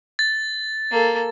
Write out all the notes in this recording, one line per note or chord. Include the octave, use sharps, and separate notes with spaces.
A6
A#3 A4